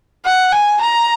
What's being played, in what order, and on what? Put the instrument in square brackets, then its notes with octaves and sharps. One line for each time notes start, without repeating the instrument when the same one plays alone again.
[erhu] F#5
G#5
A#5